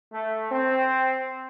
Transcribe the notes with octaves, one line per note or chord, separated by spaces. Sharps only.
A3
C4